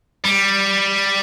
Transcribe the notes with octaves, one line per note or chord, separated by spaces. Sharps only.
G3